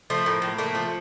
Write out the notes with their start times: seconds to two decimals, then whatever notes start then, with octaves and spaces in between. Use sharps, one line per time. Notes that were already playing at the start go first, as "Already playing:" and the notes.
0.10 F3 A3
0.26 A2 A#3
0.42 A2
0.58 A3 A#3
0.75 F3